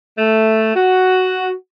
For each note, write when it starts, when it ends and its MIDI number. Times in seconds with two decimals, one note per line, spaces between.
0.18 0.74 57
0.75 1.53 66